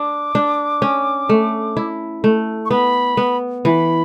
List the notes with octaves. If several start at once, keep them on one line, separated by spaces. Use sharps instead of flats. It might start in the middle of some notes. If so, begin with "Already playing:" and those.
Already playing: D4 D6
D4
C#4
A3
E4
A3
C#6
B3 B5
B3
E3 B5